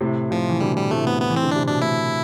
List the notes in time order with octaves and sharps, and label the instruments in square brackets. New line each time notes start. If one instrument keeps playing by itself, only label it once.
[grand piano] A2 C3
[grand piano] A2 C3 [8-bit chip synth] F3
[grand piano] E3
[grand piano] B2 D3 [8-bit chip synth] G3
[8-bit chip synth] G3
[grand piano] A2 C3 [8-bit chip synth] A3
[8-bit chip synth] B3
B3
[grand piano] E3
[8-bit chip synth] C4
[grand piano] D3
[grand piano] C3 [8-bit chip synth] D4
[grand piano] B2 [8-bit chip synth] D4
[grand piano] A2 [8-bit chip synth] E4